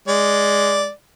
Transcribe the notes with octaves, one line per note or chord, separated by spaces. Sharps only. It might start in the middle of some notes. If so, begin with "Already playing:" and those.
G#3 D5